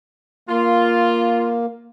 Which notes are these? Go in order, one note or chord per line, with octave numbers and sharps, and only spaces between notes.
A#3 F4